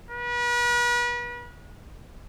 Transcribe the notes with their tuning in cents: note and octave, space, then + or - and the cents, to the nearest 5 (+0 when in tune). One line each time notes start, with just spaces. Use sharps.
B4 -40